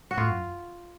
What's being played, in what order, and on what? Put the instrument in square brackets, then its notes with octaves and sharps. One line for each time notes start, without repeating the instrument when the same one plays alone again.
[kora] F#4
[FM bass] A2 [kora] F4
[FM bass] F#2